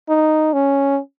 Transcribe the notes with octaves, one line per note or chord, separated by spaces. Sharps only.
D#4
C#4